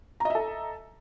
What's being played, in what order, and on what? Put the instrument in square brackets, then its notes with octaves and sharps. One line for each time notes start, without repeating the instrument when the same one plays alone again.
[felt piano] A#5
D#5
E5
A4